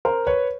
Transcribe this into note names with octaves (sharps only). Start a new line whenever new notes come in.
A#4 C5
B4 C#5